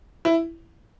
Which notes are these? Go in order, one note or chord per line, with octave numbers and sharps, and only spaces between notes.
E4